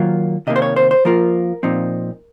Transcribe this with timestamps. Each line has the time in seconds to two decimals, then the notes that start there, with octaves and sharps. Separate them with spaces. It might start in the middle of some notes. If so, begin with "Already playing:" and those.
Already playing: D#3 F#3 A#3 F4
0.47 C3 D#3 A#3 D#5
0.56 C5
0.62 C#5
0.76 C5
0.91 C5
1.05 F3 A#3 F4 A#4
1.63 A#2 F3 C4 D#4